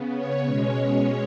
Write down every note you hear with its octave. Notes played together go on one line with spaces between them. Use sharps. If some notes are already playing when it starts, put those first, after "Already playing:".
Already playing: C#3 B3
C#5
B2 G#3 C#4